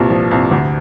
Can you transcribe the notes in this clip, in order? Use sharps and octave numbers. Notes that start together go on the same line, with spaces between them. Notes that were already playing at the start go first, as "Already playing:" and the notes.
Already playing: C2 G2 A#2
F3
C2
D2